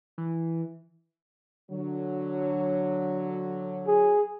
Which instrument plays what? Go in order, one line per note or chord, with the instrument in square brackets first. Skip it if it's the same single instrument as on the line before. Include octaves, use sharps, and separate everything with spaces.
[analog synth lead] E3
[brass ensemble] D3 F#3
[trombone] G#4